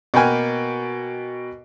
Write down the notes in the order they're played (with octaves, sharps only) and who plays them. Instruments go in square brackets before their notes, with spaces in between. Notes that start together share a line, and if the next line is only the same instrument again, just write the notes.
[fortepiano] B2 A#3 B4 G5 G#5 F6